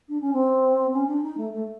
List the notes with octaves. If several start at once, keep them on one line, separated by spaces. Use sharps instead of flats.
D4
C#4
C4
C#4
D4
D#4
A3
A3